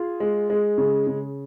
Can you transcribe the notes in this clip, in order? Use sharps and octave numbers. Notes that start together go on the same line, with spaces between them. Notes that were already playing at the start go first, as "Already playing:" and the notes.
Already playing: F4 G#4
G#3
G#3
C#3
C#3